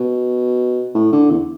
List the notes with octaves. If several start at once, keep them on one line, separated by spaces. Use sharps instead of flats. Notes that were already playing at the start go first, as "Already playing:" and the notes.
Already playing: B2
A2
D3
E2